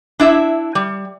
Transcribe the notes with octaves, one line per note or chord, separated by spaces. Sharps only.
D4 E4 E5
G3